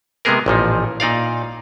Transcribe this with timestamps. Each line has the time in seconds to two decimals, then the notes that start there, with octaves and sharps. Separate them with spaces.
0.25 C3 G#3 A#3 B3 G#4 A#4
0.46 A1 A#2 F3 D#4
1.00 A#2 D#4 D5 F5